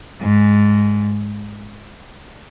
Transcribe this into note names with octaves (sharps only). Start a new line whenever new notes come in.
G#2